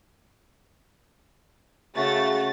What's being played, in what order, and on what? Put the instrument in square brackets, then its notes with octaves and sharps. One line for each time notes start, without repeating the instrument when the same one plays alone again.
[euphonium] C#3 [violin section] A3 A6 [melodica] F#4